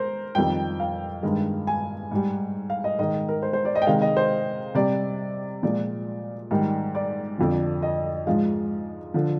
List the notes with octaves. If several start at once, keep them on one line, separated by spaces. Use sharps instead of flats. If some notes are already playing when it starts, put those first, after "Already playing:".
Already playing: G#3 A#4 C5
F2 D#3 G3 G5
F5
G2 D#3 G#3
G#5
G#2 G3
F5
D#5
G#2 D#3 G#3 D#5
A#4
C5
C5
D5
D#5
G5
C3 D#3 G#3 F5
D#5
C5
C3 G3 D5
A#2 F3 G#3 D5
G#2 D#3 G3
D5
F2 D3 F3
D#5
G#2 F3 G#3 F5
D3 F3